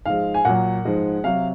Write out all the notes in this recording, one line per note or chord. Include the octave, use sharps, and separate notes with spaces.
G#2 F3 G#3 F5
G#5
A#2 F#3 F#5
G#2 F3 G#3
C3 F#3 F5